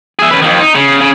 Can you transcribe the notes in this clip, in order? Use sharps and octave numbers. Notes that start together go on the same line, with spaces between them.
G#4 E5
C#4 B4
F2 D#3
D#4
C#3
C#3